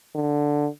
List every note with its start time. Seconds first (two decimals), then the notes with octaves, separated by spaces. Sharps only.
0.15 D3